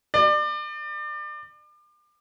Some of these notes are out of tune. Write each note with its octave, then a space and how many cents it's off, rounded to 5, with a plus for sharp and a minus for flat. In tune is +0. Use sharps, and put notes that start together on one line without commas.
D5 +30